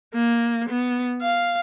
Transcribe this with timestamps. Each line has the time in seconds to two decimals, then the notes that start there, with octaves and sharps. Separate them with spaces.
0.14 A#3
0.69 B3
1.22 F5